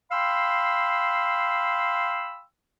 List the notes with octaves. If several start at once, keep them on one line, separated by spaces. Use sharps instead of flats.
F5 G5 B5 C6 E6